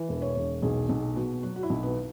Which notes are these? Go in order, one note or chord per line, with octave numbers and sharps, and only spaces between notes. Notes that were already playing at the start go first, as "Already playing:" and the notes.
Already playing: E3
E1
C#5
E1
B1 G#4
B1
B2
F#3 F#4
F#4
E4
B1
B3